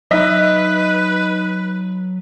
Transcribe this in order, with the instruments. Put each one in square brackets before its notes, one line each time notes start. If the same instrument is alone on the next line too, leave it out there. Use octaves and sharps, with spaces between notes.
[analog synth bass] F#3 [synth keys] D#4 B6 [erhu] B4 [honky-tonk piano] D#5 E5